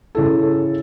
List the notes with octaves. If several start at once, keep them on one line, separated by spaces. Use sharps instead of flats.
C#3 E4 A4